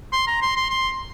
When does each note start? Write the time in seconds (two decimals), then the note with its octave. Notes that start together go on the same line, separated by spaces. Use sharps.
0.12 C6
0.27 A#5
0.42 C6
0.56 C6
0.70 C6